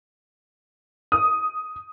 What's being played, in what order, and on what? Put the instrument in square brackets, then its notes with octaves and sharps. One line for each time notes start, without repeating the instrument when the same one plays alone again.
[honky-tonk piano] D#6